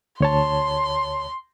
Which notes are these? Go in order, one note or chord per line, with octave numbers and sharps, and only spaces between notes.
D2 C#5 A5 C6